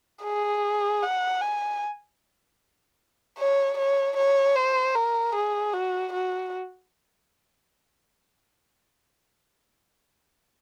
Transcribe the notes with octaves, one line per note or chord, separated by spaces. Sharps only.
G#4
F#5
G#5
C#5
C#5
C#5
C5
A#4
G#4
F#4
F#4